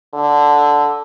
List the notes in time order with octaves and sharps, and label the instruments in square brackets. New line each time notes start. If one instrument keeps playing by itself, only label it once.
[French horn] D3